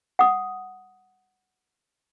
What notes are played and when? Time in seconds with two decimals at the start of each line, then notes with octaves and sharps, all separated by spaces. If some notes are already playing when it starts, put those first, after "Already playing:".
0.19 F#5 D#6